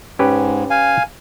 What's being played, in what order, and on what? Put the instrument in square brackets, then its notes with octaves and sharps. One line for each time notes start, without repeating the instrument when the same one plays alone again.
[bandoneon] G#2 [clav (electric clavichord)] C#4 G4 B4
[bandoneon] F5 G#5